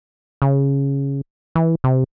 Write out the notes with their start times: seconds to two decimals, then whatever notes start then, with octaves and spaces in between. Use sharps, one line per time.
0.42 C#3
1.55 E3
1.84 C3